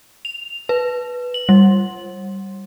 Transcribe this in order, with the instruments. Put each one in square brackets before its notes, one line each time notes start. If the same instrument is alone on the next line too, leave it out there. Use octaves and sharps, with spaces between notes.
[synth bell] F7
B4
F#7
G3